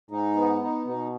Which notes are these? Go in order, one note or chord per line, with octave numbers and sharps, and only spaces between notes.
G#2 D#4
B3
D#4
B2 D#4